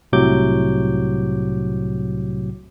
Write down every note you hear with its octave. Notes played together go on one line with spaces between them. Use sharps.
C2 A2 C3 F#3 D6 G6